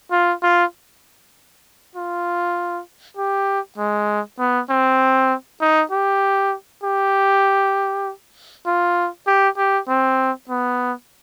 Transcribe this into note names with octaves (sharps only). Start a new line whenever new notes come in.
F4
F4
F4
G4
G#3
B3
C4
D#4
G4
G4
F4
G4
G4
C4
B3